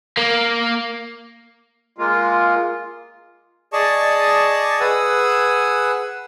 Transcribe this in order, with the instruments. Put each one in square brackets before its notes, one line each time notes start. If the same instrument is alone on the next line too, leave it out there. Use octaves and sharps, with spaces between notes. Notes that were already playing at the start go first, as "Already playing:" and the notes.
[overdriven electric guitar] A#3
[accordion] G#3 A#3 F4
[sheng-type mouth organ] G#4 D5 D#5 A5 C#6
G#4 B4 F#5 G#5 E6